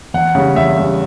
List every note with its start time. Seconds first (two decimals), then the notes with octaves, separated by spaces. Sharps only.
0.14 E2 F#5
0.35 C#3 G3
0.55 E2 E5
0.77 C#3 G3